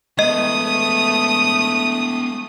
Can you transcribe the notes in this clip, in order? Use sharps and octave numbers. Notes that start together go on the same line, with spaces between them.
G#3 A3 B3 D#5 D#6